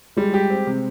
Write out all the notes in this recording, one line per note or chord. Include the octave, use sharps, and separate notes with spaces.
G3 G#3
G4
C4
C3